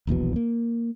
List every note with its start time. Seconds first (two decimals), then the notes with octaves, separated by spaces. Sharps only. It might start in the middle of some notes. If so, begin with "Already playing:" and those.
0.07 D#1 A#1 E2 B2
0.36 A#3